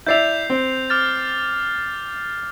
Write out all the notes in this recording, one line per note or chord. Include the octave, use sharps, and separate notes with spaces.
E4 D5 E5 G6 C7 F7
C4
D6 F6 A6